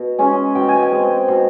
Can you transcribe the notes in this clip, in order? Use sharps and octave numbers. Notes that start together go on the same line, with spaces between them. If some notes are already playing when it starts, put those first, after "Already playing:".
Already playing: B2
G#3 C#4 G#5
B2 G5
G#5
G5
G#3 C4
B2